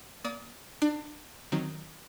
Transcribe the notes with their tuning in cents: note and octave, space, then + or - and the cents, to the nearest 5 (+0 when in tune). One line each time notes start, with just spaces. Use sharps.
A#3 +20 D5 -25 D#6 +30
D4 +30 D5 +20
D#3 +0 F#3 +0 C4 -10